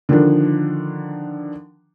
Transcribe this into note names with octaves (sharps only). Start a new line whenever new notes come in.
D3 D#3 F3 D4